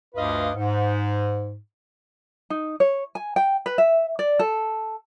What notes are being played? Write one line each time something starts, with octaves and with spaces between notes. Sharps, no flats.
D2 G2 F4 B4 D#5 F5
G#2
D#4
C#5
G#5
G5
B4
E5
D5
A4